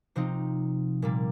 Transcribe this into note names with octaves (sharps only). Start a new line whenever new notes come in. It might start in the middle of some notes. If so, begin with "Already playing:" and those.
C3 F3 C4 D#4
A#2 G3 A#3